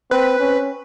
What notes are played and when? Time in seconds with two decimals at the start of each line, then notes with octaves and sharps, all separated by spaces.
0.11 C4 B4
0.40 C#4